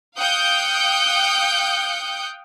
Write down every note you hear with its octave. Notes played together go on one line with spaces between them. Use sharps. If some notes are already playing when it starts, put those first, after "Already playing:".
F5 G5 D#6 F#6 G6 C#7